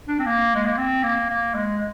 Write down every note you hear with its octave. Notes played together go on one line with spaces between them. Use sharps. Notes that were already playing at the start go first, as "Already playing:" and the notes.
D4
C4
A#3
G#3
A#3
C4
A#3
A#3
G#3